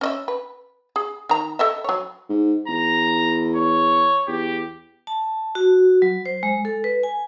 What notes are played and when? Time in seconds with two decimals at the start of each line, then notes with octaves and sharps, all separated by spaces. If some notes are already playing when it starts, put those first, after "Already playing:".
0.01 C#4 D#5 E5
0.28 B4
0.96 G#4
1.29 D#3 A#5
1.59 A4 D#5 E5
1.84 F#3 C#5
2.29 G#2
2.68 E2 A#5
3.56 C#5
4.28 E2 G4
5.07 A5
5.55 F#4
6.02 F#3
6.26 C5
6.43 G#3
6.65 A4
6.84 B4
7.03 G#5